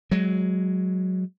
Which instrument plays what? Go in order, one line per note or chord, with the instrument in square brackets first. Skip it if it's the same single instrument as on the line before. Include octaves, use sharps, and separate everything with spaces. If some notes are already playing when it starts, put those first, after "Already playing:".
[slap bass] F#3 G#3